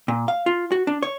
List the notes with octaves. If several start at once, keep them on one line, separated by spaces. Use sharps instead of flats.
A#2
F5
F4
F#4
D4
C#5